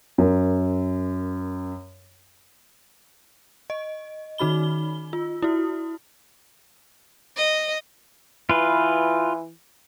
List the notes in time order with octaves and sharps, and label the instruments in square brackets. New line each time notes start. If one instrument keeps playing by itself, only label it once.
[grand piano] F#2 A#4
[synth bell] D#5
D#3 D#4 F#4 B5 G7
F4
E4 F#4
[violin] D#5
[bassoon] E3 [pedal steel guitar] F4 B4